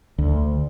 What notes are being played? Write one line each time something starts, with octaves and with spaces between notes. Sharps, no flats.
D2